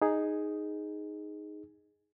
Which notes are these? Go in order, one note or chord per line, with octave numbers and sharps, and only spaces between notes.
D#4 G#4